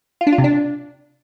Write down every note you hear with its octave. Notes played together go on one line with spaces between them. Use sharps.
F4
D4
F4
C3
D4